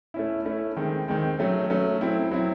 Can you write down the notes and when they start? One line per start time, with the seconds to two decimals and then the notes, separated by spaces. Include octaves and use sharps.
0.14 A3 C#4 E4
0.45 A3 C#4 E4
0.77 D#3 G#3 C4
1.08 D#3 G#3 C4
1.39 F#3 A3 C#4
1.70 F#3 A3 C#4
2.01 F#3 C4 E4
2.31 F#3 C4 E4